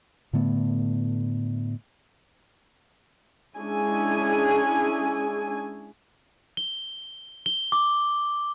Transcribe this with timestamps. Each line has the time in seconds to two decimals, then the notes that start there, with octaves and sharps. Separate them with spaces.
0.33 A2 D3 A3 B3
3.57 G#3 C#4 D4 E4 G#4 G#5
6.57 G7
7.46 G7
7.72 D6